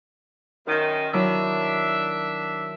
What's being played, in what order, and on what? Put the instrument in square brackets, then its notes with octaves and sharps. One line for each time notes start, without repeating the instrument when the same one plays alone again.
[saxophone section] F#2 D#3 [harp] A#4 G6
[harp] D#3 F#3 E4 [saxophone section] D4 E5